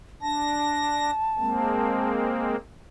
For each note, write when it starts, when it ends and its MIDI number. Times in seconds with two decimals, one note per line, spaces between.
0.22 1.10 62
0.22 2.11 81
0.22 1.10 94
1.38 2.56 56
1.38 2.56 58
1.38 2.56 60